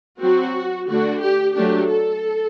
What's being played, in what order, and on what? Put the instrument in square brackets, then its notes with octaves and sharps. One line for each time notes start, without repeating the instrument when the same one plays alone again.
[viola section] F#3 C4 F#4
D3 A3 D4 F#4
G4
F#3 A3 D4 G4
A4